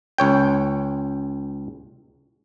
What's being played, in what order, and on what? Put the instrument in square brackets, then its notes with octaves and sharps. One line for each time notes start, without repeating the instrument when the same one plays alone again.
[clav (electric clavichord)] C#2 C#5 G5